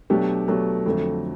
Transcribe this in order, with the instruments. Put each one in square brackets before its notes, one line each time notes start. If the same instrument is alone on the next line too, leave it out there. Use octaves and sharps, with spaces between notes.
[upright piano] B2 F#3 A3 D4 G4
B2 F#3 A3 D4 G4
F2 D3 F#3 A3